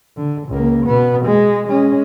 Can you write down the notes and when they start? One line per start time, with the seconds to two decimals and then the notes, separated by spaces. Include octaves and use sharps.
0.16 D3
0.49 C#2 A#3
0.85 B2 B3
1.25 G#3
1.67 G#3 C#4